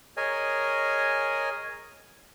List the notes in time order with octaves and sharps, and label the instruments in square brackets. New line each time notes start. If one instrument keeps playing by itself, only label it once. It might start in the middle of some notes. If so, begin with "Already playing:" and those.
[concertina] G#4 A#4 C#5 D#5 G#5